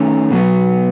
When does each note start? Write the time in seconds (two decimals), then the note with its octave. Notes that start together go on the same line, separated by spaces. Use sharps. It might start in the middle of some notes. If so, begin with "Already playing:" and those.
Already playing: D#3 A3 C#4
0.31 B2 F#3 B3